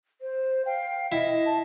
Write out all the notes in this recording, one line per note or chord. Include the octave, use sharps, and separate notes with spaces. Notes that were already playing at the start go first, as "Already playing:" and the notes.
C5
F5 G5
E4 D#5
A5